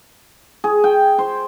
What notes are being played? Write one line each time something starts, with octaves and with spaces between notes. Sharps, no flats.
G#4
G5
C5